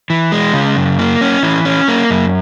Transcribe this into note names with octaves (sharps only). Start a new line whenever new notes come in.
E3
G#3
C#3
F#2
A#3
C#4
E3
C#4
A#3
F#2